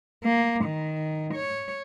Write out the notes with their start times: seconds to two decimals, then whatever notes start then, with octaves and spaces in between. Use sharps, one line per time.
0.24 A#3
0.65 D#3
1.35 C#5